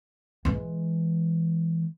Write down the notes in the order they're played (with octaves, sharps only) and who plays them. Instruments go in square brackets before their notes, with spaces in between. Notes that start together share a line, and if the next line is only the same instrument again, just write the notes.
[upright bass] E3 G#3